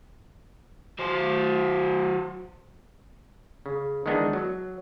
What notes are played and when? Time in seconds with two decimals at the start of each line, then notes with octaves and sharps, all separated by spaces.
0.99 F#3 C5
3.66 C#3
4.06 D#3 E3 G#3 B3 D4 D#4
4.33 F#3